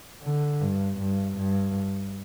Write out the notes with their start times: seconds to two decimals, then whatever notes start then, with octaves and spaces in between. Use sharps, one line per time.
0.23 D3
0.61 G2
0.99 G2
1.37 G2